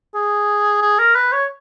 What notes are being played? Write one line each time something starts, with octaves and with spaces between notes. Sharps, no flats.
G#4
G#4
A#4
B4
C#5